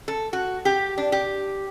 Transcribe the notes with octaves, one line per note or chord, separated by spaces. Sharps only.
A4
F#4
G4
D4
G4